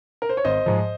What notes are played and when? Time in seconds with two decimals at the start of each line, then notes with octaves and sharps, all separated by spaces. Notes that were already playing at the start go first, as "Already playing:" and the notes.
0.22 A#4
0.29 C5
0.37 C#5
0.45 G#1 C5 D#5
0.66 G#2 F3